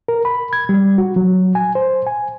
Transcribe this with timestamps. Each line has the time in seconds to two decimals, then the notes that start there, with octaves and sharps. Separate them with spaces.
0.08 A#4
0.25 B5
0.53 G#6
0.69 G3
0.98 F#4
1.16 F#3
1.55 G#5
1.75 C5
2.07 G#5